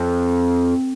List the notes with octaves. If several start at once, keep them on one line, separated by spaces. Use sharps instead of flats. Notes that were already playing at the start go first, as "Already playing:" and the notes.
Already playing: F2